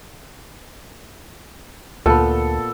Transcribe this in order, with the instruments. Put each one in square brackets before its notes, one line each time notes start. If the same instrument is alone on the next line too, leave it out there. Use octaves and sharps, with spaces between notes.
[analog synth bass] D2 [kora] A#2 B3 [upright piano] A4